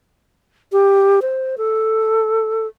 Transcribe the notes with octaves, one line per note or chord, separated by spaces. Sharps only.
G4
C5
A4